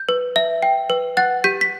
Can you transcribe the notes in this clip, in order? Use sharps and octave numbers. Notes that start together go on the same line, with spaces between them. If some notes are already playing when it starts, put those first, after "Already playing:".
Already playing: G6
B4
E5
G5
B4
F#5 F#6 A6
G4 G6 B6
B6